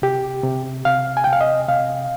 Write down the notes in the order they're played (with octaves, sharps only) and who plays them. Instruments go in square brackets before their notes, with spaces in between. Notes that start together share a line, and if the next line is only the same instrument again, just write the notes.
[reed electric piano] C3 G4
C3
C3 F5
G#5
G5
C3
F5
D#5
C3 F5